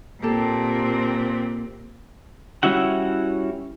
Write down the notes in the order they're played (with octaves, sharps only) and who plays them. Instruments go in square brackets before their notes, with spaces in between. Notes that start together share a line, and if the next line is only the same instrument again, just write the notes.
[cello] A#2 C4 [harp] A#3 G4 A4
[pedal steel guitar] G3 C#4 E4 F#4 F#5